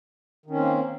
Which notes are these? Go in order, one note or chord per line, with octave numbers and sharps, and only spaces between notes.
D#3 A#3 C4 C#4